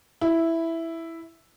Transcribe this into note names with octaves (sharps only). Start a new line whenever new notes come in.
E4